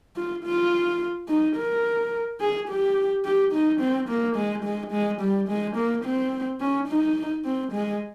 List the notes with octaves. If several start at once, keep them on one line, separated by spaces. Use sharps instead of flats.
F4
F4
D#4
A#4
G#4
G4
G4
D#4
C4
A#3
G#3
G#3
G#3
G3
G#3
A#3
C4
C#4
D#4
C4
G#3